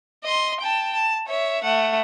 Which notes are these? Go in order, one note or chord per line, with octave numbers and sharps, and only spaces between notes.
D#5 C6
G5 A5
A5
C#5 E5
A3 F#5